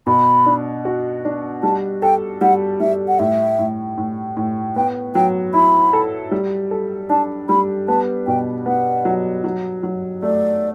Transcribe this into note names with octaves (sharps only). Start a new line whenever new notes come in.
B2 B5
D4
F#4
D4
G3 A5
A4 G5
G3 F#5
G3 E5
F#5
A2 E5
A2
A2
A2
B3 G5
F#3 G5
E4 B5
A4
G3
A4
D4 A5
G3 B5
B3 A5
B2 G5
B3 F#5
F#3
F#3
F#3
A3 D5